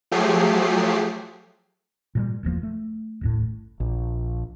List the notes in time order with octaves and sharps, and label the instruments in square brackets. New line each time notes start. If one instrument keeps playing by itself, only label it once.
[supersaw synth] F3 F#3 A3 G4 G#4 C7
[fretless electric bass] A#2 F#3 G3
F1 E2 F3 A#3
A3
D#1 A1 A2
[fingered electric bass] A#1